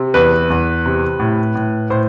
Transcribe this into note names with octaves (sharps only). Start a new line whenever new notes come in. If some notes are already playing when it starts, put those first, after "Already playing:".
Already playing: C3
E2 B4
E2
C3
A2
A2
A2 C5